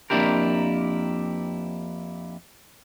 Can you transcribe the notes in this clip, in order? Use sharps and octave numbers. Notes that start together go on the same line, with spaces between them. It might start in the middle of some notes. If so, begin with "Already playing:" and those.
F2 A#3 D4 E4 G4 A#4